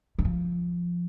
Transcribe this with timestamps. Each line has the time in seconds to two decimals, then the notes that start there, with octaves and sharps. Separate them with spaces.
0.19 D#3
0.25 F3